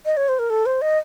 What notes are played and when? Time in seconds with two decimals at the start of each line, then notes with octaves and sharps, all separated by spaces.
0.06 D#5
0.17 C#5
0.28 C5
0.39 A#4
0.50 A4
0.66 C5
0.82 D#5